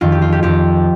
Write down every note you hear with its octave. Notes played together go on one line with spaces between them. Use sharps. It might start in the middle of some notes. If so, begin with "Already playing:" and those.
F2 D#3 F4
G4
F4
G4
F2 D#3 G4